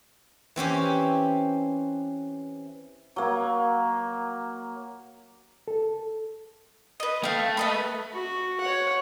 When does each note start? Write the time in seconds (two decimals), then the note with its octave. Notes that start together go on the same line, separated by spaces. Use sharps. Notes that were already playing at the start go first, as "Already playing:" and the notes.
0.56 E3 C4 C#4 G4
3.16 F#3 A#3
5.68 A4
7.00 B4 D#5
7.24 A3 F5 G5
7.57 B4 D#5 B5
8.12 F#4
8.60 C#5 F#5